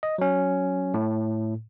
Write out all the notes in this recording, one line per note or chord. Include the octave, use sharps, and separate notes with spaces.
D#5
F#3 C#4
A2